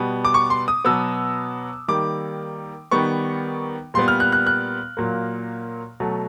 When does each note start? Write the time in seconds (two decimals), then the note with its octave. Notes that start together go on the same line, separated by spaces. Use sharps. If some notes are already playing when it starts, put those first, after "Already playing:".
Already playing: B2 G3 B3
0.25 D6
0.34 C#6
0.50 C6
0.68 D#6
0.85 B2 F#3 B3 E6
1.88 D#3 G3 A#3 D6
2.91 D#3 G3 B3 C#6
3.94 A#2 G3 B3 C6
4.08 F6
4.20 F#6
4.32 F#6
4.47 F#6
4.97 A#2 F#3 A#3
6.00 B2 F#3 A3